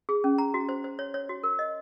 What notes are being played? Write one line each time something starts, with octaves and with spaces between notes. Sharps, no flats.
G#4
C#4
A#5
F#4
C5
C5
C#5
C#5
F#4
A#4
D#5